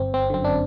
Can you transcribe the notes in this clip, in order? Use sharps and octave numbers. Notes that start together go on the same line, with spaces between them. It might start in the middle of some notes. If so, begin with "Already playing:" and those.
Already playing: G1 C4
C4
F#2 D3 C4
D4